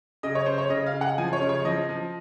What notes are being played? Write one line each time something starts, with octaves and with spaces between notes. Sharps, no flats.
C#3 D#5
C#5
C#3 C5
C#5
C#3 D#5
F5
C#3
F#5
F3 G#5
C#5
C#3
C#5
F3 D#5
F3